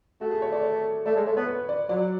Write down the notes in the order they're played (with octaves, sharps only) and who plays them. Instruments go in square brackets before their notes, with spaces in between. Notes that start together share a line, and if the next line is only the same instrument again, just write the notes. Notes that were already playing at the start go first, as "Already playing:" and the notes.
[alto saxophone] A3 [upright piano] F#4
[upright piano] G#4
C#5
D5
C#5
[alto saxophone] A3 [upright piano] D5
[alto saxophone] G#3 [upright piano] C#5
[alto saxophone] A3 [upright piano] C#5
[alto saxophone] B3 [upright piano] C#5
[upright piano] B4
D5
[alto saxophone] F#3 [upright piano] D5